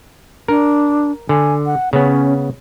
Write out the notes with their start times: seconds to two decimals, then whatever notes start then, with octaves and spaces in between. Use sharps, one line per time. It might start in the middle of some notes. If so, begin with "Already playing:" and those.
0.48 D4 A#4
1.29 D3 G#5
1.66 F#5
1.93 C#3 B3 C#4